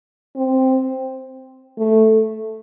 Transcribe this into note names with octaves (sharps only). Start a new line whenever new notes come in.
C4
A3